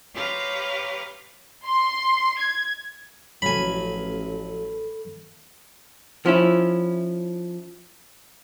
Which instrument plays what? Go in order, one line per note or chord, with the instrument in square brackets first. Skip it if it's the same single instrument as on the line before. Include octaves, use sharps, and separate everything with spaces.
[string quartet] G4 B4 C#5 F5 A#5 C6
[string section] C6
G#6
[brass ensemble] A1 [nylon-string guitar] F3 F#3 [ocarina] A4 [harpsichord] G#5 B5
[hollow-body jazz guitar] F3 C#4 E4